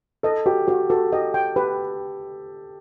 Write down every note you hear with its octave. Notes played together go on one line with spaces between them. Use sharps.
A4 D#5
F#4 G4
F#4 G4
F#4 A4
G4 D#5
G5
G4 B4